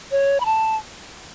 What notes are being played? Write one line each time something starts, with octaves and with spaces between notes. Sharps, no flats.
C#5
B5
A5